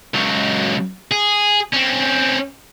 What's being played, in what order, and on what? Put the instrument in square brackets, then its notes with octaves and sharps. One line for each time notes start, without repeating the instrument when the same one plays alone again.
[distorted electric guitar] C#2 F#3
G#4
C4 C#4